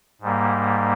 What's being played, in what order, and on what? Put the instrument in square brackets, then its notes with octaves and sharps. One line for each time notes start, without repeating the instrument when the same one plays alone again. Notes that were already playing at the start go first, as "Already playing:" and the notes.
[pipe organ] G#2 G3 A#3